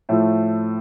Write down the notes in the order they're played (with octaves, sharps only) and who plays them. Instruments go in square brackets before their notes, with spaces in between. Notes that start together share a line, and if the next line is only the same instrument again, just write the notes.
[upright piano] A2 F3 A3